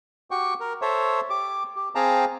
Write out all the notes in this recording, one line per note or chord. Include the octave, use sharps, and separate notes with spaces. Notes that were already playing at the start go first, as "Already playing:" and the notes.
F#4 G4 G5 C#6
A#4
A4 C5 C#5 E5
G4 D6
G4
C4 G#4 F5 G5 A5 A#5